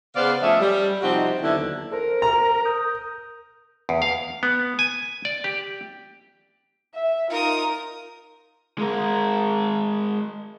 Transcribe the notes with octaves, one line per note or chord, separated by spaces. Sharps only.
C#3 B3 C5 D5 F5
F3 A3 C#4 D#5 E5
G3
C3 F3 C4 D#4 F#4 G4
D#2 D3 F#3 B3 E4
A4 A#4 C5
A#5
D#6 G6
E2
F5
B3
G#5
D5
G4
E5
D#4 F4 A#4 D#6
G#3 A#4